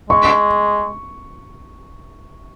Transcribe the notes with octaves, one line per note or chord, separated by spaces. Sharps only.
G#3 C#6